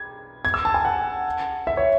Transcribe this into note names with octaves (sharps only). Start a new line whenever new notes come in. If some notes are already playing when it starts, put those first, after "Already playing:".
Already playing: G#6
G#6
E6
A5
G#5
F#5
E5
C#5